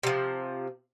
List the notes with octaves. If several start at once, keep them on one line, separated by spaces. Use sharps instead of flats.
C3 F3